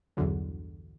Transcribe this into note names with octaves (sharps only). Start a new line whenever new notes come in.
B1 E2 G2 D3 F#3